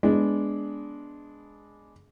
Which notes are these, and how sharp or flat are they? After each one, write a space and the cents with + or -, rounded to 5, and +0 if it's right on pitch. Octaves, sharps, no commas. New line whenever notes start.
G#3 +0 B3 +0 D4 -10